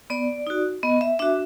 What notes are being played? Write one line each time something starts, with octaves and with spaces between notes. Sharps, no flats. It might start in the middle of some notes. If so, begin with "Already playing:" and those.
B3 D5
D#4 F#4
B3 D#5
E5
D4 F#4 E5